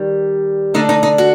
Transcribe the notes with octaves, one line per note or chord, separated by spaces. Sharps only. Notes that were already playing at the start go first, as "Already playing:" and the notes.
Already playing: D#3 G3
D3 A3 D4 D#4
D#4
D#4
F#4